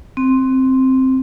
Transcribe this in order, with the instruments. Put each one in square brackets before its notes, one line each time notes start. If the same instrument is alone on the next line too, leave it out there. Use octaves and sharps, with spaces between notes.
[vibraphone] C4